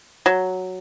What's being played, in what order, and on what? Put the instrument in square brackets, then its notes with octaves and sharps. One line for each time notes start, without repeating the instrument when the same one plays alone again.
[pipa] F#3